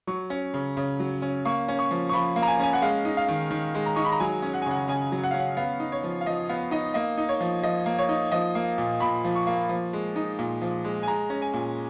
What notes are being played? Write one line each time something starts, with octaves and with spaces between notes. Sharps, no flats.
F#3 C#6
C#4
C#3
C#3
F#3
C#4
A#3 C#6
C#4
C#6
F3
C#6
F3 B5
A#3
A#5
G#5
C#4 G#5
F#5
G#3 F5
D#4
F5
D#3
D#3
G#3
A#5
D#4 C#6
B5
A#5
F#3 G#5
C#4
F#5
G#5
C#3 F#5
C#3 G#5
F#3
F#5
C#4 F5
F#5
B3 F5
D#4
C#5
F3
F5
F3 D#5
B3 F5
D#4 D#5
A#3 D#5
D#4
C#5
F3
F3 D#5
A#3
C#5
D#4
F3 D#5
A#3
A#2
A#2 B5
F3
C#6
A#3
F3
G#3
D#4
A#2
F3
G#3
G#5
G#3 A#5
C#4
G#5
A#2